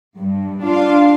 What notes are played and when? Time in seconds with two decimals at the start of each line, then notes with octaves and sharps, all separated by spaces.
0.18 G2
0.63 D4 F4 F5